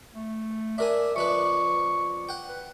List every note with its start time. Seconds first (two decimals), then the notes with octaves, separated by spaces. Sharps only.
0.15 A3
0.78 D4 A#4 E5 G#5
1.16 F2 D4 B4 C#6
2.29 F#5 G5
2.49 B4